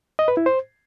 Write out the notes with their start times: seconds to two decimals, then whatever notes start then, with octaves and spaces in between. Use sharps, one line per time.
0.19 D#5
0.28 B4
0.37 E4
0.46 C5